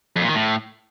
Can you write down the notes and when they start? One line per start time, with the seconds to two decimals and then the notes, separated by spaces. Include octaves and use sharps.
0.16 F2
0.22 A#2
0.28 D#3
0.34 A2